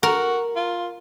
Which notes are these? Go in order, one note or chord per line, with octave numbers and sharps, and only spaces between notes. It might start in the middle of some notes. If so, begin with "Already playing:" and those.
F#4 A#4
F4